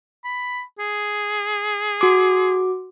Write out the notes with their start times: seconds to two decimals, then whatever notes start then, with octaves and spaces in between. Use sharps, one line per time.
0.25 B5
0.79 G#4
2.01 F#4 D6